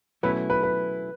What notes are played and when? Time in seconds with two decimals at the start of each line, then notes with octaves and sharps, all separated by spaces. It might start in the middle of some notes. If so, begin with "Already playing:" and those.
0.23 B2 F#3 A3 C#4 E4 B4
0.50 B4
0.63 B4